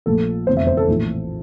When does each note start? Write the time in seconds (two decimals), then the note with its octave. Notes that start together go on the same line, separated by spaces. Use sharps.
0.06 A#1 A#2 F3 A3 A4
0.47 F1 E2 D3 A3 C4 C5
0.57 E5
0.67 C5
0.77 A4
0.88 A#1 A2 E3